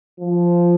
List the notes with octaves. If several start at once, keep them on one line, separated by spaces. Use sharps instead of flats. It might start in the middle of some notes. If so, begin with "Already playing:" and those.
F3